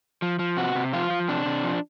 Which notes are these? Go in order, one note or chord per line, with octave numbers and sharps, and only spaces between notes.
F3
F3
C3 F#4
C3
F3 F4
F3
C3 D4
C3
F3